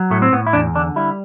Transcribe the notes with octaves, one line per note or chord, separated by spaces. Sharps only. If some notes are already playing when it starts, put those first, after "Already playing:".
Already playing: F#3
A2 A3
C4
A2 B3
E4
E2 D4
D3 D4
G3 E4